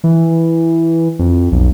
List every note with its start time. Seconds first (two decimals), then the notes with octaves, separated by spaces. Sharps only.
0.04 E3
1.19 F2
1.52 B1